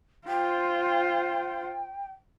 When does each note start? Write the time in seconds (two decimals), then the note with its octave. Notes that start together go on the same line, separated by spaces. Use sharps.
0.28 F4 C5 G5